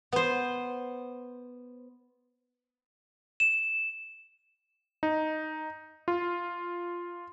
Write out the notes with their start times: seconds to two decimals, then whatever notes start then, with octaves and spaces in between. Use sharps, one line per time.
0.13 B3 C5
3.40 E7
5.03 D#4
6.08 F4